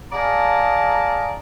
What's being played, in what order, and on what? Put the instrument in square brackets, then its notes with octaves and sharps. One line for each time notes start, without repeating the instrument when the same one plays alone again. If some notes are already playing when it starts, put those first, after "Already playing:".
[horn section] G#4 D5 D#5 F5 A5 A#5